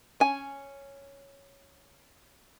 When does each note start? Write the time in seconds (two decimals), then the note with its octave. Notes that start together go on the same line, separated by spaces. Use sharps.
0.20 C#4 G#5